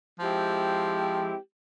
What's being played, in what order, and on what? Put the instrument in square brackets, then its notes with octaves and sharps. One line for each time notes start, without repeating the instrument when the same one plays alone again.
[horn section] F3 G#3 C4 E4 G4